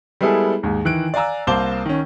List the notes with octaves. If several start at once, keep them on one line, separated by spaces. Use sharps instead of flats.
G3 G#3 B3 E4 G#4 A4
D#2 G#2
D#3 E3 F#6 D7
D5 F5 G#5 A#5 E6
C2 A#3 C5 A5 D6 G7
D#3 C#4